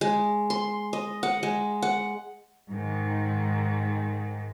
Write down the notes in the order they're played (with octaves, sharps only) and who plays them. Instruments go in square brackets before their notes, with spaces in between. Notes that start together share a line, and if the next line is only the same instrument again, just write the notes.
[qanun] G#3
C6
D#5
F#5
G#3
F#5
[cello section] G#2 D#3